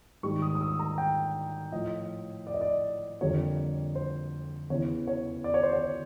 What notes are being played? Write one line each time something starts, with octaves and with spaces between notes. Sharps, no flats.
G#2 D#3 G3 A#3 C#6
D#6
D#6
E6
A#5
G5
A2 F3 A3 D#5
D5
D#5
D5
F2 D3 G3 A#3 C#5
C5
E2 C#3 E3 C#5
C#5
D5
C#5
C5
C#5